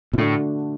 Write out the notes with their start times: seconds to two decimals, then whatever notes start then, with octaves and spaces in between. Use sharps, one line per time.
0.13 B2
0.18 A2 D3 A3 D4 F#4